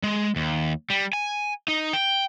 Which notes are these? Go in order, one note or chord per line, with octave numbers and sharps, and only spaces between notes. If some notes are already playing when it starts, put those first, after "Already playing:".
G#3
D#2
G3
G#5
D#4
G5